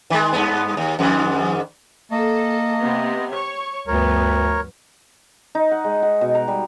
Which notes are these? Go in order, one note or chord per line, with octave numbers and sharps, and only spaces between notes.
D#3 G#3
G2 B3
D#2
F2 G#2 D#3
A#3 A4 D#5
C3 B3
C#5 C#6
D2 G2 F3 B3 A#4 C#5
D#4
F#5
G#3
F#5
B2
A#5
G3